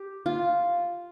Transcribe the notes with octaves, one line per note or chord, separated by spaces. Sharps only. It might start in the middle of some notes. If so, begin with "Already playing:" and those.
Already playing: G4
F4